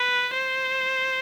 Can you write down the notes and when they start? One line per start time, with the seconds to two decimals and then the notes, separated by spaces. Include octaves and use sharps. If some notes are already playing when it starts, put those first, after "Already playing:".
Already playing: B4
0.33 C5